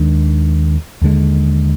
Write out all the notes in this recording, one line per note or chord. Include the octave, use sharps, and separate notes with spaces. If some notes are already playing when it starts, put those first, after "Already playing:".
Already playing: D#2 D#3 G#3 D4
D#2 D3 G#3